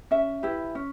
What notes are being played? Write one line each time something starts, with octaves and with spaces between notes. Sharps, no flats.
C#4 E5
E4 G4 B4
C#4